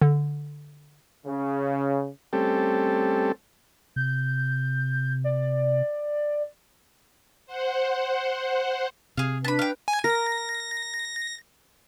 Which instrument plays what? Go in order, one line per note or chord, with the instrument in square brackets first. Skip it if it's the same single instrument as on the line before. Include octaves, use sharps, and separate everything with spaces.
[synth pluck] D3
[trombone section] C#3
[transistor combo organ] G3 A3 C4 C#4 G4 A4
[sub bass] C3 [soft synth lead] G6
[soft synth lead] D5
[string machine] C5 F#5
[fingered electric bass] C3 [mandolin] G#4 F5
[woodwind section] D4 B4 [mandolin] A5 B5
[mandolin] F5 G5
[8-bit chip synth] G#5
[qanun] A#4 [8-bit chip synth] A#6